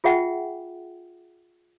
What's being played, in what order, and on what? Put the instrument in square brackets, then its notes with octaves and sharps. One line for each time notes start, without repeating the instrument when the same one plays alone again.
[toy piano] F4 G#4 E5 F#5 G5